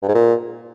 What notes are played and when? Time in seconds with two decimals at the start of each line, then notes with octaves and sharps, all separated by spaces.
0.03 G2
0.09 G#2
0.15 A#2